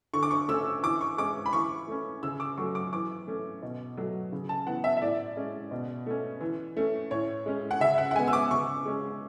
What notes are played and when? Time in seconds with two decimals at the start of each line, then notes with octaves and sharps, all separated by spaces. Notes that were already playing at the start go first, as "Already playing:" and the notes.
0.13 D3 C#6
0.23 D6
0.31 C#6
0.48 A3 C#4 E6
0.83 E3 D6
1.01 C#6
1.18 G#3 C#4 D6
1.46 B5
1.53 E3 C#6
1.88 A3 C#4
2.23 C#3 E6
2.40 D6
2.57 F#3 A3 C#6
2.75 D6
2.93 E3 D6
3.27 A3 C#4
3.62 B2
3.97 F#3 A3
4.32 C#3
4.49 A5
4.67 E3 B3 F#5
4.84 E5
4.97 E5
5.02 A2 D5
5.37 G#3 C#4
5.71 B2
6.06 A3 C#4
6.41 E3
6.76 A3 C#4
7.11 A2 C#5
7.46 G#3 C#4
7.71 F#5
7.80 C#3 E5
7.98 F#5
8.11 F#5
8.15 G#3 B3 G#5
8.28 E6
8.33 D6
8.50 C#3 C#6
8.85 G#3 C#4